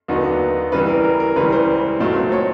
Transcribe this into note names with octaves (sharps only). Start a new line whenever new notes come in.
D#2 D3 F#3 B3 D#4
C#3 E3 G3 B4
A#4
A#4
A#4
C#2 C#3 E3 G3 B4
C5
A#2 F#3 A3 C4 D#4
C#5